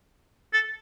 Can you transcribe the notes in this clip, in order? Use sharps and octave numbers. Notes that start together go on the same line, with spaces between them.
A4